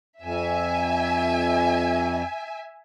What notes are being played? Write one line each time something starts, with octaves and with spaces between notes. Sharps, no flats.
F2 E5 G#5